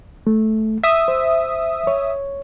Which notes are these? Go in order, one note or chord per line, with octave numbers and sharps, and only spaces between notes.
A3
E5 D#6
C5
C#5